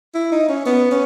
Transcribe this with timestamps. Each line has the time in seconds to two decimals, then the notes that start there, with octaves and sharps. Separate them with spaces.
0.14 E4
0.32 D#4
0.48 C#4
0.66 B3
0.91 C#4